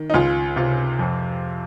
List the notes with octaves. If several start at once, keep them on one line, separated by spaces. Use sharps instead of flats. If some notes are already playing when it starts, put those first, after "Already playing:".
Already playing: D#3
D#4
C#2 F4
C3 F4
F2